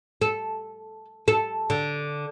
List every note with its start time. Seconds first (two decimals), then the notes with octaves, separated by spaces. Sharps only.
0.22 A4
1.28 A4
1.70 D3